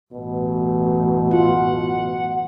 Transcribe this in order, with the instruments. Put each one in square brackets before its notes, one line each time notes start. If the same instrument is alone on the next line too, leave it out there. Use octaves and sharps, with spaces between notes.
[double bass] A1 F#2 [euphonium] B2
[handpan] F4 [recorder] F#5